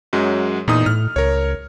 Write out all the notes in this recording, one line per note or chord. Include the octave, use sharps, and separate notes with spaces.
F#2 F#3 G#3
E2 A#2 D#4 D#6
A2 F6
C#2 A#4 C#5